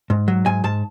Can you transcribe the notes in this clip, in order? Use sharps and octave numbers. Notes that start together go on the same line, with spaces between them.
G#2
F#3
G#2 G#5
G#2 A5